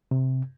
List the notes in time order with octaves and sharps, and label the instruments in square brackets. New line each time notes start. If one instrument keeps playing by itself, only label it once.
[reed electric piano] C3